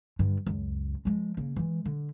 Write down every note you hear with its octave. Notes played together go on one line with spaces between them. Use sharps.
G2 D3
C#2 F#2
F3 G#3
C#3 A#3
E3 G#3
D3